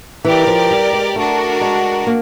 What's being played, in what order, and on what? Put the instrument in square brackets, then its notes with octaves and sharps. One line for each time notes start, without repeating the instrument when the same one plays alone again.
[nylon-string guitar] E3 [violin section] G4 A#4 D5
[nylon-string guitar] F3
G3
G#3
[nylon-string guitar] A3 [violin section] D4 F#4 A#4
[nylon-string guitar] G#3
A#3